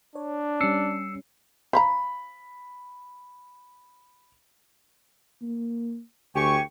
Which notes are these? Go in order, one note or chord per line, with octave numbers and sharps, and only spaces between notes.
D4 C#5
G3 C#4 E6 C7 C#7
C5 F5 A#5 B5
A#3
D2 G4 G#5 C#6